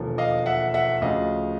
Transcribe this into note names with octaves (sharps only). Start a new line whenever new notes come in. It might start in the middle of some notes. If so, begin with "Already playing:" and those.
Already playing: E1 D#2 D3 F3
D#5 F5
E5 F#5
E5 F#5
D2 C#3 F3 D#5 F5